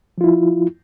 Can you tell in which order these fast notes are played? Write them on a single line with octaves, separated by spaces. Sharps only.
F3 F4 E4